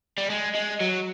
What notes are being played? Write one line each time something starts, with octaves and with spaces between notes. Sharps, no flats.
G3
G#3
G#3
F#3